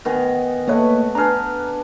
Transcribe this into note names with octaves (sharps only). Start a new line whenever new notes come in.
D#3 B3 G#4
A3 A#3 B4 C#5 D#5
D4 G#4 B4 A#5 F6